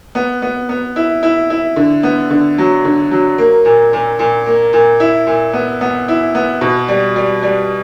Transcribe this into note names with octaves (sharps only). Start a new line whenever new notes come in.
B3
B3
B3
E4
E4
E4
D3
B3
D3
F#3
D3
F#3
A#3
A#2
A#2
A#2
A#3
A#2
E4
A#2
B3
B3
E4
B3
B2
G3
G3
G3